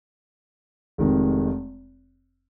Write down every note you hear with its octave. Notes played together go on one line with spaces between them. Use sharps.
F1 F2 D#3 G#3